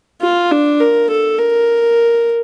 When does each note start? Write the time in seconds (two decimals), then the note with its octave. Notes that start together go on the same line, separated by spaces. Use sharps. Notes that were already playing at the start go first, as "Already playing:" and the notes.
0.22 F4
0.51 D4
0.80 A#4
1.10 A4
1.39 A#4